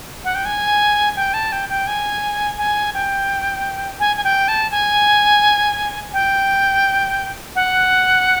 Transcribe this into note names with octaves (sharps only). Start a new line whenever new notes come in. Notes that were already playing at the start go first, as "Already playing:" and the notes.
F#5
G5
G#5
G5
A5
G5
G5
G#5
G#5
G5
G#5
G#5
G5
A5
G#5
G5
F#5